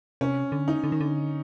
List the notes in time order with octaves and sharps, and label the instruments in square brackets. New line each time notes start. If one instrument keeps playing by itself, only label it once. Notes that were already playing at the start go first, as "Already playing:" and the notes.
[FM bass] C3 [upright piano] C#4
[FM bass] D3
[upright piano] D#4
[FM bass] D3
D#3
D3